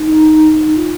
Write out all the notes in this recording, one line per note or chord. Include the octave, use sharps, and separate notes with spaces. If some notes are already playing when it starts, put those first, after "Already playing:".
Already playing: D#4
F4